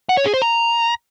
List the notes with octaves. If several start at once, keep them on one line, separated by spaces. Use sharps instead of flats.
F#5
C#5
G#4
C5
A#5